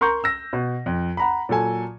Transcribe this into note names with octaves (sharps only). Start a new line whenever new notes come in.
A#4 A#5 C6 C#6 G6
E6 A#6
B2
F2
F#5 A#5 B5
A#2 F#3 A4 G#5